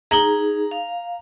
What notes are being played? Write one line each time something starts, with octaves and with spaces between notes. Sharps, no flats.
D#4 G#4 A#5 F#7
F5